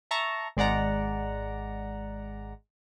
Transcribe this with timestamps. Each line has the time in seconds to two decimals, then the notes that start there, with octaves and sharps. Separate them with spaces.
0.11 E5 A5 A#5 C#6
0.57 G#1 G#3 D5 F#5 A#5